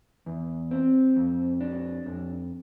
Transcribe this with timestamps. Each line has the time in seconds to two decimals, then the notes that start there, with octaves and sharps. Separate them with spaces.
0.26 E2
0.71 C4
1.16 F2
1.61 D4
2.06 F2